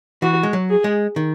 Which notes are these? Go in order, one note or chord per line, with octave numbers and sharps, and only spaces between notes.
E3 F#4
G#3
F#3
G#4
G#3
D#3